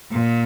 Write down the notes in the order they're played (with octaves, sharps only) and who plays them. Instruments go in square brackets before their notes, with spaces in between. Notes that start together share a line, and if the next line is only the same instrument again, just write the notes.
[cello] A#2